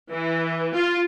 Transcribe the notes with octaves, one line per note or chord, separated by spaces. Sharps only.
E3
F4